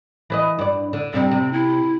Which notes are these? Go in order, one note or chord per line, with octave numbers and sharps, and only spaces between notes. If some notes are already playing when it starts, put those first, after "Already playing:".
E3 B4 D#5
G2 D5
D3
G2 C3 G3 C4
C3
E4